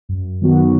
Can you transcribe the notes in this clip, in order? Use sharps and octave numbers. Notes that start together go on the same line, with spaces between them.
F#2
D#3 F#3 B3 F#4